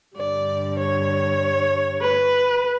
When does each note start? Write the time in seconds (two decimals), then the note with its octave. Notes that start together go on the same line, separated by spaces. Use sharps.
0.15 G2 D3 G3 D5
0.78 C#5
2.00 B4